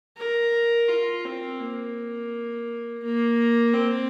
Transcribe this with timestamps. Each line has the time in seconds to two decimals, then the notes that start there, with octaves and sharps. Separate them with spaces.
0.17 A#4
0.88 F4
1.25 C4
1.60 A#3
3.03 A#3
3.74 C4